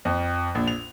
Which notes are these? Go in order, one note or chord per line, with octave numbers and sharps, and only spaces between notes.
F2
A#1
F7